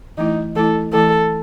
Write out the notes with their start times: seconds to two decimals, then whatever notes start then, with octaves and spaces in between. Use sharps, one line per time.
0.18 E3 A3 D#4 E4
0.56 E3 A3 E4 A4
0.93 E3 A3 E4 A4